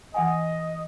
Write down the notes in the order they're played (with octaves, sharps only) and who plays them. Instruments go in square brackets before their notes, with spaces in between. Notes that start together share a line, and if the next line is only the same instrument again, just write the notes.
[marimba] E3 F#5 G#5 [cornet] D#5